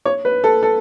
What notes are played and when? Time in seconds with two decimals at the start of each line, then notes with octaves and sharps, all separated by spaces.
0.05 C#5
0.25 B4
0.44 A4
0.63 A4